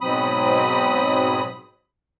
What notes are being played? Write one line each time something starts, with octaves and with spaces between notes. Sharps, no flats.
G#2 B2 F#3 C4 B5 D#6